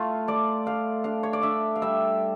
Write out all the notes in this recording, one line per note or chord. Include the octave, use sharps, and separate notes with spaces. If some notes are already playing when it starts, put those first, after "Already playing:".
Already playing: A3 F4
A3 D5
A3 F5
D4 F5
C#5
D5
D4 E5
F5
G3 E5